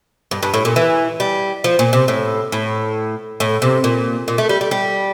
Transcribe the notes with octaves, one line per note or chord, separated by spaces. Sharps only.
G2
G2
A2
A#2
E3
G3
F3
A#2
C3
A2
A2
A2
C3
A#2
A#2
A3
G3
G3
G3